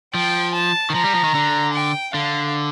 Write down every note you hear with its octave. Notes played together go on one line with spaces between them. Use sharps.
F3 G5
A5
D#3
F3 A#5
G3
F3
D#3
D3
G5
D3 F5